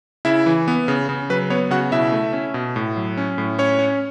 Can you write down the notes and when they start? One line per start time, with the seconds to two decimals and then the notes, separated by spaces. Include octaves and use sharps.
0.25 C#3 E4 E5
0.46 E3
0.68 B3
0.88 C#3
1.09 C#3
1.30 F#3 B4
1.50 B3 C#5
1.71 C#3 F#4 F#5
1.92 B2 E4 E5
2.12 A3
2.33 C#4
2.54 B2
2.76 A2
2.97 F#3
3.17 C#4
3.38 A2
3.59 C#4 C#5
3.79 C#4